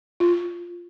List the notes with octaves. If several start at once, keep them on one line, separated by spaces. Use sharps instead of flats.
F4